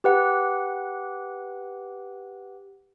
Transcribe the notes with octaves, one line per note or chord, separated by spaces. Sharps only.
G4 B4 F#5